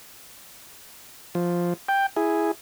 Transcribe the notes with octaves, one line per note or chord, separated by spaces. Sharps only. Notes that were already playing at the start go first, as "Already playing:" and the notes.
F3
G5
E4 G#4